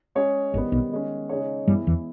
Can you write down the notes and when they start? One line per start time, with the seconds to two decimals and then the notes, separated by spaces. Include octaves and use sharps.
0.15 G#3 C#4 G#4 C#5
0.53 G#1 G#2 D#3 G3 B3
0.72 B1 B2
0.91 D#3 G#3 C#4
1.29 C#3 G#3 D#4 G#4 C#5
1.67 G2 E3 G3 G#3 B3 E4
1.87 E2 E3